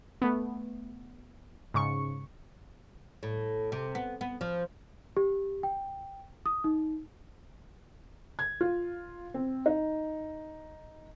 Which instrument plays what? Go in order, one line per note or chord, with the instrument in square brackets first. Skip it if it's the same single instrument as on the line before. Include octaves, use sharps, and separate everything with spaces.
[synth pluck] A3 B3
G#2 C#3 C#6 C#7
[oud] A2
C3
B3
B3
F3
[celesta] G4
G5
D#6
D#4
[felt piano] G#6
F4
C4
D#4